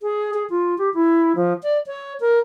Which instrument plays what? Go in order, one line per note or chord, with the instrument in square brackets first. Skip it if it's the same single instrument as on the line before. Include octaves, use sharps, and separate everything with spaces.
[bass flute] G#4
G#4
F4
G4
E4
F3
D5
C#5
A#4